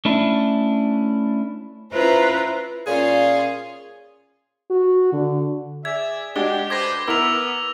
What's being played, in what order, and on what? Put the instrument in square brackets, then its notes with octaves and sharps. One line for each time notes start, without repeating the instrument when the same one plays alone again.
[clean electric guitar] A3 C#4 D4 E4
[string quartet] C#4 E4 F4 B4 C5 A#5
[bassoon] A#2 [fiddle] C#4 F4 [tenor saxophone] G#4
[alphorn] F#4
D3
[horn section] G#4 D5 E5 [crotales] G#6
[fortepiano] G#3 D4 F#4 [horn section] G4 [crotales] G7
[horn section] A4 B4 C5 [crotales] D6 G#6 A#6
[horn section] B3 [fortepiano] E4 A#4 [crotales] E6 F7